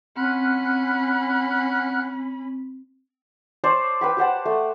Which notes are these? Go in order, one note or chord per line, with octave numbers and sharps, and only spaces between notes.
C4 C#4 F#5 B5 F6 F#6
C5 D5 A5 C#6
B4 G5 B5
G4 C5 F#5 A5
A3